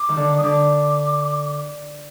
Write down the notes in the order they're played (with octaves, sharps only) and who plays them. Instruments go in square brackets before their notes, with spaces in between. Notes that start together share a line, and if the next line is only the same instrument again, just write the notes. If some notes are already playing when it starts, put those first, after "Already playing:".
Already playing: [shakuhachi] D6
[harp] D#3
D3
[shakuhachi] D#6
[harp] D3 [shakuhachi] D6